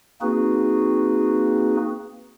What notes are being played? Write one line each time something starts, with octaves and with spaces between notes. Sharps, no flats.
A#3 C4 D#4 F#4 G#4 B4